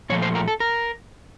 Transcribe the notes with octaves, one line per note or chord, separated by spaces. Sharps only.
A#2 F3 A3 C#5
C5
A#4
A4
A#4